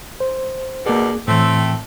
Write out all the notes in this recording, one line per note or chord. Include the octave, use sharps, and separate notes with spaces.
C5
D2 B2 A#3 G#4 D5
A2 E3 A3 C4